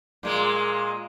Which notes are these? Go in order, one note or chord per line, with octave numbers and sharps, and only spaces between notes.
A#2 G#3 A#3